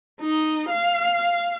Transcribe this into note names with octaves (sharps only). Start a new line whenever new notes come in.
D#4
F5